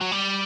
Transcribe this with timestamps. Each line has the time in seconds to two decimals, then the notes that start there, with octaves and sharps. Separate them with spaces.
0.01 F#3
0.12 G3